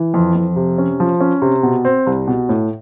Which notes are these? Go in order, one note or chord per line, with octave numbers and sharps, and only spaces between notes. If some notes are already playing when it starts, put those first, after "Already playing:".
Already playing: E3
F2
F2
C3
C#4
F3
C#4
C3
B2
C4
C2
B2
A2